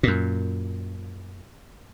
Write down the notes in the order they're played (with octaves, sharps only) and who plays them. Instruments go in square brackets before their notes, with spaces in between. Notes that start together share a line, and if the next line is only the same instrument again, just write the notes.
[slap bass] F#2 A#2